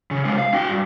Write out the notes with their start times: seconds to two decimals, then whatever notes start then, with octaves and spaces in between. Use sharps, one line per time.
0.11 C#3
0.25 C3 G#3
0.38 F5
0.54 F#4 G5
0.70 G2